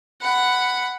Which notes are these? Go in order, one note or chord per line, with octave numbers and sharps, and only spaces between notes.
F#5 B5